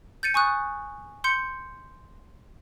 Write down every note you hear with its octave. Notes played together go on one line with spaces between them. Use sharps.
G6 A6 C#7 D#7
G#5 C#6 D#6 F#6
C6 G6 C#7